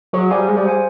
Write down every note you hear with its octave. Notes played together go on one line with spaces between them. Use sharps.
F#3 G#4
G3 C5 F5 G#5
G#3 G#4
G3
C5 F5 G#5